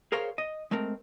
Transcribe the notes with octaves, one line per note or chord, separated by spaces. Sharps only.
G#4 A#4 C5 C#5 F5
D#5
G#3 A3 C4 A#4